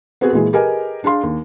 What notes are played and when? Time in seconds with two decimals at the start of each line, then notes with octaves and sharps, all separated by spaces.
0.21 B3 C4 F#4 G#4 B4
0.33 A#2 E3 G#3 G#4
0.53 G4 G#4 A#4 B4 D#5 G#5
1.04 D4 G#4 F5 C6
1.23 D#2